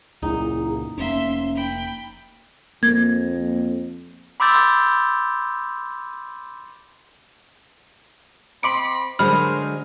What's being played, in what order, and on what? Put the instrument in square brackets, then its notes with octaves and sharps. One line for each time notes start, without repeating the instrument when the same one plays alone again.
[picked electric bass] C#2 F#2 A#2 [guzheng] D#4 [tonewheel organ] E4 G#4
[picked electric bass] F1 A#3 [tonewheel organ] C#4 [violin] E5 C6
[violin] G5 B5
[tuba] F2 [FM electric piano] A#3 [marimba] G#6
[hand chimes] B5 C6 D6 E6 G6 A6
[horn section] C4 D#5 B5 [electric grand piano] C6 D6 C#7 [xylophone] D7 F#7
[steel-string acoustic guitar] D3 F#3 G#3 [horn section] A#4 C5 [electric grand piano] D#5 F6 [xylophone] B5